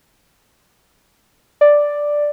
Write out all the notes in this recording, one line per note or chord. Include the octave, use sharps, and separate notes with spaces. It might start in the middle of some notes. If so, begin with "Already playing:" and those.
D5